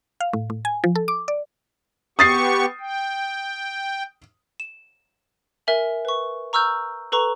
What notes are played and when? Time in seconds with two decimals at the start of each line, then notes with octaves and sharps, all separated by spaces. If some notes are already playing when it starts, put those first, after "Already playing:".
0.21 F5
0.33 A2
0.50 A2
0.65 G#5
0.84 F3
0.95 A4
1.08 D6
1.28 D5
2.19 B3 G4 C#6 D#6 A6 C7
2.80 G5
4.60 E7
5.67 A#4 E5 G#5 F#7
6.05 B4 C#6
6.53 A#5 C#6 E6 F6 G6
7.12 A4 B4 A#5 C#6